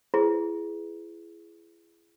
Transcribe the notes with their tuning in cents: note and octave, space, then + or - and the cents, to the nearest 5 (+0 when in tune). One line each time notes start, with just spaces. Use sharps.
E4 +40 G#4 +5 B4 +20